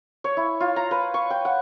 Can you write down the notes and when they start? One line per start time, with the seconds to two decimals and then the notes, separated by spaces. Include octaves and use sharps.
0.24 C#5
0.37 E4
0.60 F4
0.76 A#5
0.91 B4
1.14 C#6
1.30 G5
1.45 F#5